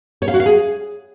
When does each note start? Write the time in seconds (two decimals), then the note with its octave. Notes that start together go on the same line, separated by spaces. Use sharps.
0.22 C#5
0.28 F5
0.34 F#4
0.40 F5
0.46 G#4